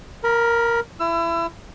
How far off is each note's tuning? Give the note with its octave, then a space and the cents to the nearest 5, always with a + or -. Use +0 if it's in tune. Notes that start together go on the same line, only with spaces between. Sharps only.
A#4 +0 B5 -40
E4 +25 E6 +35